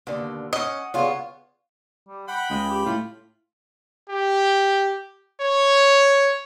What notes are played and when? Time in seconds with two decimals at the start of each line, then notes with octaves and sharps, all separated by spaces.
0.07 D#2 B2 D3
0.53 C#4 D#5 F#5
0.94 C#3 G3 B3 F4 C#5
2.09 G3
2.28 F#5 G5 B5
2.50 C#2 G#3
2.70 G4
2.86 A2 F4
4.09 G4
5.41 C#5